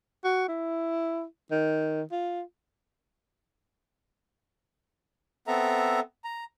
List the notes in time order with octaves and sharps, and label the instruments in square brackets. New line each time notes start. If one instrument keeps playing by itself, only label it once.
[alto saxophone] F#4
E4
D#3
F4
[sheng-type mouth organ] B3 C4 A4 E5 A#5
A#5